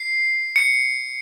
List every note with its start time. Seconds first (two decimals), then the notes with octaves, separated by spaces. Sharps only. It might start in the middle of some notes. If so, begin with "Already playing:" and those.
Already playing: C7
0.56 C#7